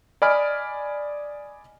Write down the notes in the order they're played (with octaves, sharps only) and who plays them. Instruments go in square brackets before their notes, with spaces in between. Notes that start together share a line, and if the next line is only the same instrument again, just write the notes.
[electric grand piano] D5 D#5 G#5 B5 F6 D7